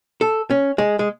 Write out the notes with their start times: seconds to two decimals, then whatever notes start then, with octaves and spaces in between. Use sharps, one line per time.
0.21 A4
0.50 C#4
0.78 G#3
0.99 G#3